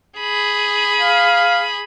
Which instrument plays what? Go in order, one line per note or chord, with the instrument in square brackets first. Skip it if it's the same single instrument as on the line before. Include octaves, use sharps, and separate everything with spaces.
[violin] G#4 B5
[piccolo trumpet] F5